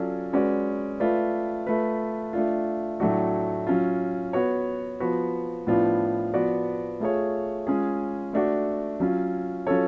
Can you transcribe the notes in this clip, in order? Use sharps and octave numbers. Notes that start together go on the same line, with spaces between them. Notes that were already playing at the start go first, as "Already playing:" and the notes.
Already playing: F#3 C#4 F4 A4 D5
G#3 C#4 F#4 B4 D5
A3 F4 B4 D5
A3 F4 B4
A3 D4 F4
A2 F#3 A3 D4 F#4
F#3 C#4 F4
B3 F#4 C#5
F3 B3 F#4 B4
A2 F3 B3 D4 F4
F3 B3 F#4 B4 D5
A3 F4 G#4 C#5
G#3 C#4 F4 G#4
A3 D4 F#4
F#3 C#4 F4
F#3 C#4 F4 A4 C#5